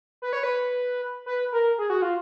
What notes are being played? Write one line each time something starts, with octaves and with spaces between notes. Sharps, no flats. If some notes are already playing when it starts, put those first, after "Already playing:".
B4
C#5
B4
B4
A#4
G#4
F#4
F4